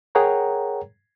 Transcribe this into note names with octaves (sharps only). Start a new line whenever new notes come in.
G#4 A#4 C#5 F#5 G5 A#5